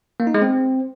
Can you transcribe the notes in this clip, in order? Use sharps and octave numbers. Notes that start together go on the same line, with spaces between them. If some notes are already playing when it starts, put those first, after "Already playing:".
A#3
D#4
G#3
C4